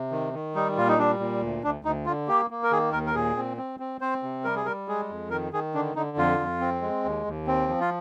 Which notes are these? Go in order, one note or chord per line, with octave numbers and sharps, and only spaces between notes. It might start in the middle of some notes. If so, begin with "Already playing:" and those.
Already playing: C3
D#3
D#3
G3 D#4
A#2 F4
D#4
G3 D4
A#2
D2
D2 D4
D2 D#4
D3 F4
A#3 G4
A#3
A#4
D#3 G#4
D#2 A#4
A#4
A#2 G#4
C4
C4
C4
C4 C5
C3
G3 A#4
G#4
G3 A#4
G#3 G#4
F2
D#3 A#4
D#3 G#4
D3 D4
D3 D#4
F2 F4
F2
C4
G#3
D#2
D#2
C4
F3
F4